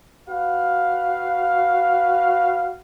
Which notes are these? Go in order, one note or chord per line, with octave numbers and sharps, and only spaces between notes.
F#4 B4 F5